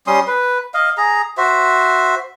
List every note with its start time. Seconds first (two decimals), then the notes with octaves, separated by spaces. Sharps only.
0.07 G3 C#4 C6 D#6
0.27 B4
0.74 D#5 F5
0.97 G#4 A#5
1.37 F#4 C5 E5